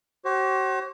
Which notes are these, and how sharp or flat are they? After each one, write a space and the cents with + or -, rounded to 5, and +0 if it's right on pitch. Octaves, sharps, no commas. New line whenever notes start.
F#4 +45 C5 +45